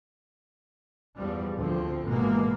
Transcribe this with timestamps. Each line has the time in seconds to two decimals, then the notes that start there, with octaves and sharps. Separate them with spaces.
1.17 E2 F3 G3
1.56 D2 F3 C4
2.03 G#1 B2 E3 G#3 A#3